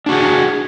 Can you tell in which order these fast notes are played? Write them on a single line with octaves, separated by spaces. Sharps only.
D4 F#4 G#4